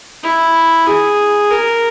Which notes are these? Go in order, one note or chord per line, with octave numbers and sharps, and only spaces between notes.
E4
G#4
A#4